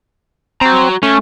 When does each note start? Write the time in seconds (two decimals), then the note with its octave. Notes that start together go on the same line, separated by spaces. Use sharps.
0.61 C4 F#4 A#5
1.03 A3 C#4